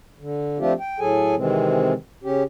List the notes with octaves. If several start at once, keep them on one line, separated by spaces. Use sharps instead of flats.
D3
F3 A3 C4 D4 F4 G4
G5
A2 F#3 G#4 A4 G#5
C3 D#3 E3 G#3 C4
C#3 C#4 G4